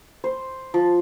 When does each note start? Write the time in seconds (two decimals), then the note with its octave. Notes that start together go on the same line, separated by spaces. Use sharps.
0.24 C5
0.74 F3